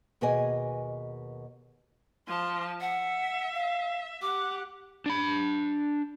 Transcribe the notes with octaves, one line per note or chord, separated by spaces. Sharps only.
D#2 B2 G#4 B4 D#5 G#5
F3 A5 C6
E5 F#5
F5
G4 F#5 D6
D4 B5